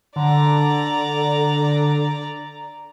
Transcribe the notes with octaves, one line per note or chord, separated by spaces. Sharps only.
D3 D5 A#5